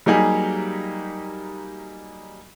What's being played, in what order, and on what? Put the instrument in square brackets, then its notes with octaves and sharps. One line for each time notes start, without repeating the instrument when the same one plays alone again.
[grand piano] F#3 G3 A#3 D#4 G4 G#4